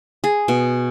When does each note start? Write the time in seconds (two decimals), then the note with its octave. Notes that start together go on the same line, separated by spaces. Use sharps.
0.24 G#4
0.48 B2